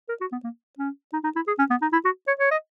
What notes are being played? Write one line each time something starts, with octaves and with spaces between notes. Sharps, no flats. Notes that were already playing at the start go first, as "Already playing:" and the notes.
A#4
F#4
B3
A#3
C#4
D#4
D#4
E4
G#4
C#4
B3
D#4
E4
F#4
C#5
C#5
D#5